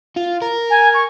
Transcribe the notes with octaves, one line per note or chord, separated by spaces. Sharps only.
F4
A#4
G#5
C#6